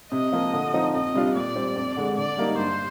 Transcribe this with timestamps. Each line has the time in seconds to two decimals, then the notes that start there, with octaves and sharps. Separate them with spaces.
0.12 C3 D#5
0.33 F3 A#3
0.53 D3
0.74 F3 C4 D#4
0.94 F2 D#5
1.14 C3 G3 D4 F4
1.35 A#2 D5
1.56 G3 C4
1.76 F2
1.97 D3 G#3
2.17 D3 D5
2.37 G3 A#3 D#4
2.58 G2 C5